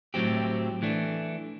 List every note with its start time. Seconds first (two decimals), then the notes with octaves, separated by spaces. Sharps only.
0.14 A2 F#3 C4 G4
0.82 E3 A3 D4